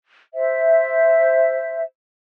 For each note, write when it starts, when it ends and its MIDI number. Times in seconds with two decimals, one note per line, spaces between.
0.34 1.82 72
0.34 1.82 76